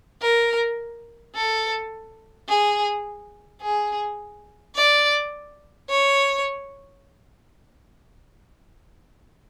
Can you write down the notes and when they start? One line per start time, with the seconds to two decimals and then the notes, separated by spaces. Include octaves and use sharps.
0.22 A#4
1.35 A4
2.48 G#4
3.62 G#4
4.75 D5
5.90 C#5